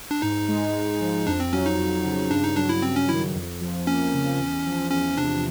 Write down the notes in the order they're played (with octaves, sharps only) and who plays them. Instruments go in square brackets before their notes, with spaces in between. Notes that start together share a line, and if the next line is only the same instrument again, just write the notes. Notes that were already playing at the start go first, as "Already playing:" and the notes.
[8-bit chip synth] D4
[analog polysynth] G#2 [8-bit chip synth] D#4
[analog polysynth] G#3
G#2
F3
[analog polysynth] F2 [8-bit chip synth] D4
[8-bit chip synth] C4
[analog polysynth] F#3 [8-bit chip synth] C#4
[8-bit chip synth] D#4
[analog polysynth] F2
C#3
[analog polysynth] G2 [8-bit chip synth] D4
[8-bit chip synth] D#4
[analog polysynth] F#3 [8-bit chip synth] D4
[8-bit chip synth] E4
[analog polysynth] G2 [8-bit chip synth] C4
[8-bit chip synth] C#4
[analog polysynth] D#3 [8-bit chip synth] E4
[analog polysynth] F2
F3
[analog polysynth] A#3 [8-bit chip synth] C#4
[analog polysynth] C#3
E2
F3
[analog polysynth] E2 [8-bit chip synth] C#4
[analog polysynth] C3 [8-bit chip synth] D4